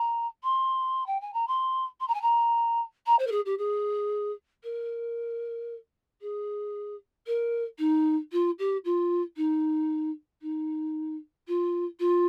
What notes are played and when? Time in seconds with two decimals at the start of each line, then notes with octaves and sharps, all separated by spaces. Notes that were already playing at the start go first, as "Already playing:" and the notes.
Already playing: A#5
0.43 C6
1.06 G5
1.21 G#5
1.34 A#5
1.48 C6
2.00 C6
2.08 A#5
2.14 G#5
2.22 A#5
3.06 A#5
3.19 C5
3.27 A#4
3.32 G#4
3.46 G4
3.58 G#4
4.64 A#4
6.21 G#4
7.27 A#4
7.79 D#4
8.32 F4
8.59 G4
8.85 F4
9.37 D#4
10.42 D#4
11.48 F4
12.00 F4